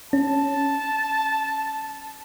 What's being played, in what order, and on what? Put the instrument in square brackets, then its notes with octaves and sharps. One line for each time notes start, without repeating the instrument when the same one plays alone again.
[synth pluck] C#4 [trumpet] A5